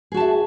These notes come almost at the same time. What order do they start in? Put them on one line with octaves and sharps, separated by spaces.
G#4 F#4 A5 E5